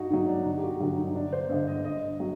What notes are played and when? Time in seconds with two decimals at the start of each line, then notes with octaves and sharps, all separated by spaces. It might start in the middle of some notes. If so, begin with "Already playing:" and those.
Already playing: G2 D#4 F#4
0.10 D#3 F#3 D#4
0.28 D4
0.45 G1 D#4
0.58 G4
0.63 F#4
0.80 G2 D3 F#3 F#4
0.97 D#4
1.15 G1 D4
1.33 C5
1.49 G2 D3 D#5
1.68 D#5
1.84 G2 D#5
2.20 F#3